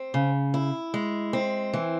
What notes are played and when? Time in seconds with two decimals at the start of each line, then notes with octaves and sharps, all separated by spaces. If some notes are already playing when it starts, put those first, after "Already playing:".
Already playing: C4
0.14 C#3
0.54 E4
0.94 G#3
1.33 C4
1.74 E3